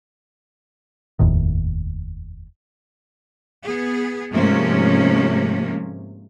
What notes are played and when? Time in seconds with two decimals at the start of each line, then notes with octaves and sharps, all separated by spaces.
1.19 F1 D#2 A2 D#3
3.66 B3 G#4
4.33 G#2 C3 F3 A3 A#3 C#4